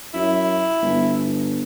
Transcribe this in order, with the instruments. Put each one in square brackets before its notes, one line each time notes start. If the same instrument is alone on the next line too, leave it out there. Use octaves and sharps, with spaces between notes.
[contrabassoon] F#2 [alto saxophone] E4
[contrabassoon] G1